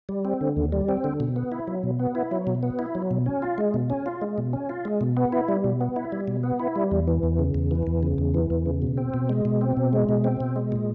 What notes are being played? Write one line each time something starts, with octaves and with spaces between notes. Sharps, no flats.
G3
C4
D3
D#2
G3
C4
D3
B2
B3
E4
F#3
B2
B3
E4
F#3
B2
B3
E4
F#3
B2
C#4
F4
G#3
B2
C#4
F4
G#3
B2
C#4
F4
G#3
B2
B3
E4
G3
B2
B3
E4
G3
B2
B3
E4
G3
E2
E3
E2
C#3
E2
E3
E2
C#3
E2
E3
E2
C#3
B2
C4
B2
G#3
B2
C4
B2
G#3
B2
C4
B2
G#3
A#2